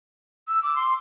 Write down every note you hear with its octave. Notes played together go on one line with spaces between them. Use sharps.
E6
D6
C6